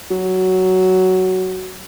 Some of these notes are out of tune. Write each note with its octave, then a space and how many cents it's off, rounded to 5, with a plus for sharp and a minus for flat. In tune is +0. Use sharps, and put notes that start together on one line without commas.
F#3 +10